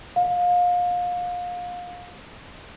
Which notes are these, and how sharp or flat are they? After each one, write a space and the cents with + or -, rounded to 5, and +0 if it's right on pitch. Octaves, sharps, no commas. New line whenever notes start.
F5 +30